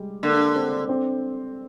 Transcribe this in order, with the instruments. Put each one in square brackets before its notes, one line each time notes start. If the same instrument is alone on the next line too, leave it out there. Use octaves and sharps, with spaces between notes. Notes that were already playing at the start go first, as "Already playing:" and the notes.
Already playing: [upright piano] G3 G#3
[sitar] D3 [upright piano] A#3
[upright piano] C4
C4